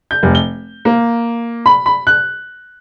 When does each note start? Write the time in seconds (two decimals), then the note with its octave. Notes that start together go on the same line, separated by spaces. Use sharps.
0.11 G6
0.23 F1
0.35 G7
0.85 A#3
1.66 B5
1.86 B5
2.07 F#6